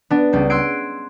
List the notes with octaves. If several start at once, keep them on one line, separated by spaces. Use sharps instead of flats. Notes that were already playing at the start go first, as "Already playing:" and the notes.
B3 D4
C#2 G3
C6 E6 F#6 G#6 C7 D7